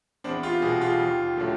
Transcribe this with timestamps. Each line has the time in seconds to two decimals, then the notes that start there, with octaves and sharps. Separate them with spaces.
0.24 E2 C4 D4
0.43 F4 G4
0.62 B2 G3 F#4 G#4
0.81 F4 G4
0.99 D#2
1.37 D3 F#3 A3